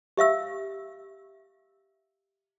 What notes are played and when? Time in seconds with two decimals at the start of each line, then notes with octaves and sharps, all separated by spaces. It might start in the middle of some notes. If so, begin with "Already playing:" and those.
0.17 G4 E5 F5 E6